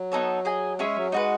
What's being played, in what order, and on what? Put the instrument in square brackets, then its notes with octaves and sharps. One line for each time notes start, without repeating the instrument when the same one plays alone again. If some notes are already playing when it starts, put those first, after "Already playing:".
Already playing: [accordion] F#3
[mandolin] B3 D#4 A4 C#5
G#4 D#5 G#5
[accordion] G#3 [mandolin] C#4 G#4 C#5 E5
[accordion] F#3
[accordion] G#3 [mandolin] D#4 F#4 B4